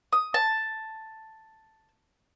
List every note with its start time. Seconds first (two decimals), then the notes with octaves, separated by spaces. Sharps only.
0.13 D#6
0.34 A5